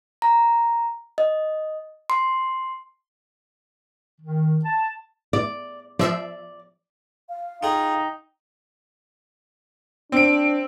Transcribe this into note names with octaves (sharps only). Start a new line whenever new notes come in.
A#5
D#5
C6
D#3
A5
D5
F3 D5 E5 C7
F5
D#4 F4 G#4 G5
C4 D4 D7